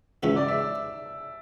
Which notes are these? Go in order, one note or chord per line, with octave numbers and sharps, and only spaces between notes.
C#2 C#3 E3 G#3 E5
D5
E5